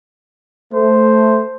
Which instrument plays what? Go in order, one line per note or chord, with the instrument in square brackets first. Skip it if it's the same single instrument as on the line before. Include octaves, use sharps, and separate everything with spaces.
[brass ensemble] A3 [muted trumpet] C5